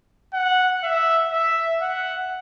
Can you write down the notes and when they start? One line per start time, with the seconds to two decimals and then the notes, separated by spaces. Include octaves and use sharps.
0.34 F#5
0.84 E5
1.32 E5
1.81 F#5